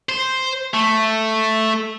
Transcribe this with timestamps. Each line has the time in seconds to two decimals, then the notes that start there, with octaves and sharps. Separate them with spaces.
0.09 C5
0.74 A3